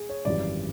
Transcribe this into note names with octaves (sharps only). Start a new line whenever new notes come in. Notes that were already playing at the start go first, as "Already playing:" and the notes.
Already playing: G#4
C#5
G#1 F#2 C#3 E3 G3 D5